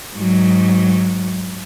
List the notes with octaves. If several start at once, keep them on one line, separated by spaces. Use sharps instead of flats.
G#2 F#3